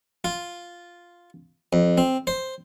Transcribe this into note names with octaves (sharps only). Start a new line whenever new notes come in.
F4
F2
C4
C5